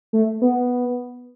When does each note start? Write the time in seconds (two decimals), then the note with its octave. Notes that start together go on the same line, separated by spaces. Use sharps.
0.13 A3
0.42 B3